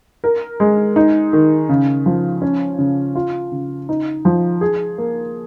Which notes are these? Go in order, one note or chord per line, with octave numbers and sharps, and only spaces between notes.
A#4
G#3
D#4
D#3
C#3
F3
C#4
C#3
F4
C#3
D#4
F3
G#4
A#3